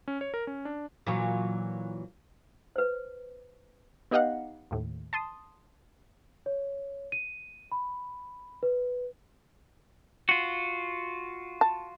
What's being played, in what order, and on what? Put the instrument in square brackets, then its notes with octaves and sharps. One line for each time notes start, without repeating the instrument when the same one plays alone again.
[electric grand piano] C#4
C#5
A#4
C#4
D4
[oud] A#2 E3 F#3
[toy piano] B4 C5
[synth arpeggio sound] B3 D#4 G4 D#5 F5 F#5
D#2 A2
A5 C6 D#6
[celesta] C#5
D#7
B5
B4
[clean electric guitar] F4 F#4
[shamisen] A5